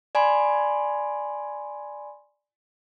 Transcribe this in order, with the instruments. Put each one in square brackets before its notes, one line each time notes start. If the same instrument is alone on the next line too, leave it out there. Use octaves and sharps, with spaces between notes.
[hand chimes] D5 G#5 B5 C6